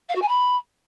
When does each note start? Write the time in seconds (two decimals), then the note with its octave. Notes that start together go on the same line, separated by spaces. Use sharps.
0.09 F5
0.15 F#4
0.21 G#5
0.28 B5